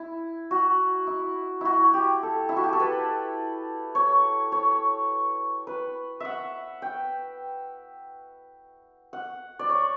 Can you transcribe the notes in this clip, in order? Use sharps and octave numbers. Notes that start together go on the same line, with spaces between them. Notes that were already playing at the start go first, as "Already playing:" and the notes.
Already playing: E4
F#4
E4
E4 F#4
G4
A4
E4
F#4
G4
A4
B4
C#5
C#5
B4
E5 F#5
G5
F#5
D5
C#5